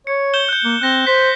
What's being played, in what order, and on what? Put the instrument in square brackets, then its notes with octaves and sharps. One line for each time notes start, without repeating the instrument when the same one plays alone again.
[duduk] C#5 [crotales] C#7
[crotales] G6 E7 G7
F#6 G6
[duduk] A#3
[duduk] C4 [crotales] F#6 A#6 G7
[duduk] C5 [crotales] B6